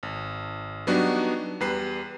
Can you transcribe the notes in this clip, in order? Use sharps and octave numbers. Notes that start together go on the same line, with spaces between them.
G#1
F#3 G3 B3 D4 D#4 F#4
E2 G3 B4 C7